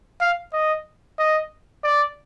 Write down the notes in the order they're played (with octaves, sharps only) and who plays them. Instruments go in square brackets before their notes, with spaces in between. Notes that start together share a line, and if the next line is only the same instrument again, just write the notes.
[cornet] F5
D#5
D#5
D5